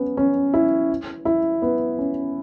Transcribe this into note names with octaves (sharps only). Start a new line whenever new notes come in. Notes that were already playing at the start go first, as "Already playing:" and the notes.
Already playing: B3 C#4
C#4
E4
E4
B3
C#4